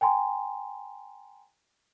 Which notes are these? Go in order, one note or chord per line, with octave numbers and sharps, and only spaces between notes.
G5 G#5 A#5 C6